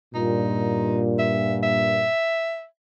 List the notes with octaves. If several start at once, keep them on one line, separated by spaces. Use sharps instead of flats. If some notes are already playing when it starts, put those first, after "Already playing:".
G2 A#2 D#4
E5
E5